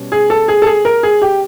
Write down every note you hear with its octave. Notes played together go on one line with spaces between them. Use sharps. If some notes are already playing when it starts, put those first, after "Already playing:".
Already playing: B2 G3 C#4
G#4
A4
G#4
A4
G#4
A#4
G#4
G4